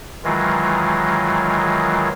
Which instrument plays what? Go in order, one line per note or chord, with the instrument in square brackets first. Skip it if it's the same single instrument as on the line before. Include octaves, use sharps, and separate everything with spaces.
[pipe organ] D#3 E3 F#3 G#3 F4